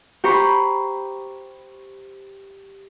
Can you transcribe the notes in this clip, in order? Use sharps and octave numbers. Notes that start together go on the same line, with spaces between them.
G4 C5 A#5 B5 C#6